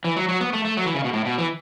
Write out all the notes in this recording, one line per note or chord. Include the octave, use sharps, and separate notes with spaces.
E3
F#3
F#3
B3
A3
A3
F#3
E3
C#3
B2
A2
B2
E3